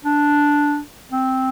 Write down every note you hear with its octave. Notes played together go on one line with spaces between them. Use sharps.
D4
C4